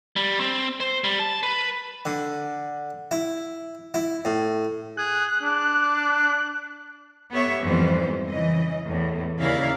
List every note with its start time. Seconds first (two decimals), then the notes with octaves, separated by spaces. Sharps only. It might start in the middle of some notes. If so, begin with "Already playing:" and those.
0.16 G3
0.40 C4
0.80 C5
1.04 G3
1.19 A5
1.43 B4
2.06 D3
3.11 E4
3.94 E4
4.25 A2
4.97 G#4 F#6
5.42 D4
7.31 B3 G4 A4 C#5 E5
7.62 F2 G#2 E3 G3 B3 C5
8.27 C#3 E3 D#5
8.87 E2 A2
9.38 D#2 C#3 E4 A#4 D5 F5